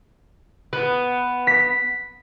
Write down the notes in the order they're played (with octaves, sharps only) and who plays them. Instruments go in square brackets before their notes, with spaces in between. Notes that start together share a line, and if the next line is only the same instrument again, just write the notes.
[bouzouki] B3
[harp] B6